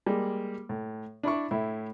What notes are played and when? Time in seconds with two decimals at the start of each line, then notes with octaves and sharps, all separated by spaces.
0.06 G3 G#3 A#3
0.69 A2
1.23 D4 E4 D5 C#6
1.51 A2 E4